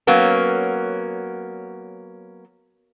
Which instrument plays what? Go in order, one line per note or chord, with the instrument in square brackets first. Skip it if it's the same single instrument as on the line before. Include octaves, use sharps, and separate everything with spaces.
[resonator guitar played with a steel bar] F#3 A#3 B3 C#4